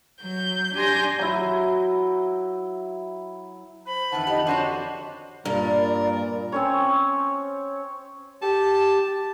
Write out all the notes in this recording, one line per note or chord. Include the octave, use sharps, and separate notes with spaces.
F#3 G6
D4 G4 G#5 C6 G6 A#6
F#3 E4
C5 B5
F2 D#3 E3 F#5 A5
D#4 G4
D3 D4 F#4 C5 C#5
G2 A#2 A#4 D5
C4 C#4 C#5
G4 A5